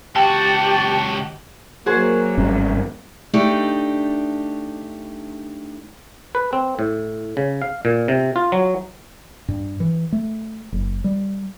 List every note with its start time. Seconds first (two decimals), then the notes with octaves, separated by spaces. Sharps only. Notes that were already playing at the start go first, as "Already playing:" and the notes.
0.16 C#2 F#4 G4 G5 A5
1.86 F#3 A#3 F#4 G#4 C5
2.38 G#1 G2 C#4
3.33 A3 D4 D#4 G4 D#5
6.35 B4
6.53 C4
6.79 A2
7.37 C#3
7.62 F5
7.85 A#2
8.08 C3
8.36 F4
8.52 F#3
9.48 G2
9.80 E3
10.12 A3
10.72 F#1
11.04 G3